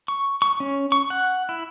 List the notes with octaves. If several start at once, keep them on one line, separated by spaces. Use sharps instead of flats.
C#6
C#6
C#4
C#6
F#5
E4